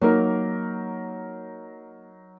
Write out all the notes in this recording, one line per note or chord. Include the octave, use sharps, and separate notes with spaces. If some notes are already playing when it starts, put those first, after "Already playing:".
F#3 A#3 D#4 A#4